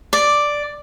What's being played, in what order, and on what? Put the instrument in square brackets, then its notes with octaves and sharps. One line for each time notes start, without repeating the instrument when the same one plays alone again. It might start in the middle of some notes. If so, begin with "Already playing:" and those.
[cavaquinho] D5